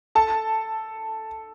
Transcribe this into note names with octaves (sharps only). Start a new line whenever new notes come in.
A4 A5